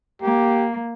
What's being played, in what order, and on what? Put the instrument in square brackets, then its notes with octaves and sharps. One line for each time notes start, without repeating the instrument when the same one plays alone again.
[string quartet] A#3 [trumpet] G4